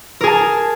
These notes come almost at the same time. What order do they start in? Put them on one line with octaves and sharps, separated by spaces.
A#4 G#4 A5